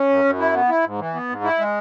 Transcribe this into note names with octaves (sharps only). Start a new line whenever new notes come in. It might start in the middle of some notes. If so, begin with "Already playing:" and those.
Already playing: C#4
F#2
F#2
E4
B3
E4
G#2
E3
B3
G#2
E4
G#3